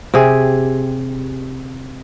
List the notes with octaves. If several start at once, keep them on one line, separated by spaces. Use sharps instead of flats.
C3 G4 G#4